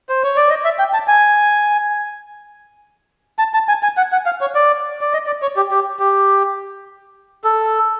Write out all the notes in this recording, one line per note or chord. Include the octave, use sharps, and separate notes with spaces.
C5
C#5
D5
D#5
E5
G5
A5
G#5
A5
A5
G#5
G#5
F#5
F#5
F5
C#5
D5
D5
D#5
D5
C#5
G4
G4
G4
A4